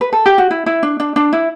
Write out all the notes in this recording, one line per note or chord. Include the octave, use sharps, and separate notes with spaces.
B4
A4
G4
F#4
E4
E4
D4
D4
D4
E4